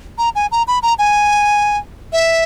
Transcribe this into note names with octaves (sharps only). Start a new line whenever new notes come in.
A#5
G#5
A#5
B5
A#5
G#5
E5